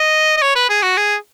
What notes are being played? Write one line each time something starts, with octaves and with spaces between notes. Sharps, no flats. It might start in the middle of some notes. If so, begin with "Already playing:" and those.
Already playing: D#5
D#5
C#5
B4
G#4
F#4
G#4